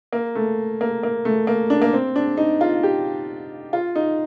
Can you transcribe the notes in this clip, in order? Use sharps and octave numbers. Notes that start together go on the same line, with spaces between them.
A#3
A3
A#3
A#3
A3
A#3
D4
A#3
C4
D4
D#4
F4
G4
F4
D#4